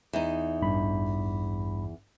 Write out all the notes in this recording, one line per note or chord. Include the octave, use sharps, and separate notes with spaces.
E2 D#4
A1 G2 B5